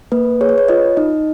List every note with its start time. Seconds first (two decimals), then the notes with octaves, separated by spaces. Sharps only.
0.12 A#3 B4
0.41 G#4 C#5
0.49 B4
0.58 C#5
0.68 F4 D#5
0.97 D#4 D#5